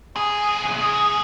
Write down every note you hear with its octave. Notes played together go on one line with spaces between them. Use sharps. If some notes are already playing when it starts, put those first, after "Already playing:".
C2 G#4